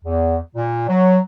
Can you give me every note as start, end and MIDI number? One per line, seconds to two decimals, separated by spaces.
0.04 0.37 40
0.56 0.85 46
0.88 1.18 54